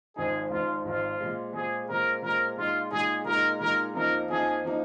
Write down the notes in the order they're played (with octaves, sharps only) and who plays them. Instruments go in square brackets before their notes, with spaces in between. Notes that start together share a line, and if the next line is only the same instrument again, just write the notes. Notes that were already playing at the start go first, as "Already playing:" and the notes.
[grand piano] G#1 G#2 F3 C4 D#4 [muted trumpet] G#4
[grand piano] G#1 G#2 F3 C4 D#4 [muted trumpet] F4
[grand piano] G#1 G#2 F3 C4 D#4 [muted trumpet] F4
[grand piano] A#2 G#3 C4
[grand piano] A#2 G#3 C4 [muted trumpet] G#4
[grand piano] A#2 G#3 C4 [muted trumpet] A#4
[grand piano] A#2 G#3 C4 [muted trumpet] A#4
[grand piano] A#2 G#3 D#4 [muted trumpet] F4
[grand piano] A#2 G#3 D#4 [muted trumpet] G#4
[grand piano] A#2 G#3 D#4 [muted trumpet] A#4
[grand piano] A#2 G#3 D#4 [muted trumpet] A#4
[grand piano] F2 F3 A#3 D#4 [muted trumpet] A#4
[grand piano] F2 F3 A#3 D#4 [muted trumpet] G#4
[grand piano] F3 A#3 D#4